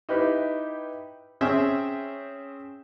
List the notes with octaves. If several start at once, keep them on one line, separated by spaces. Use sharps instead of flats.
D#4 E4 G4 B4
C4 C#4 G#4 E5 G5